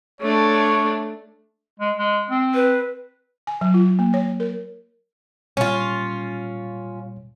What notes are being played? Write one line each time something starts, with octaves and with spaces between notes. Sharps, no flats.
A3 D4 C#5
G#3
G#3
C4
B4
G#5
F#3
F4
A#3
C#5
A#4
A#2 G3 C#4 F4